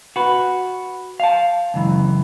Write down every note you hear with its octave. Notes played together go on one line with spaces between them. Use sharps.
F#4 B4
F5 A5
C#2 F#2 E3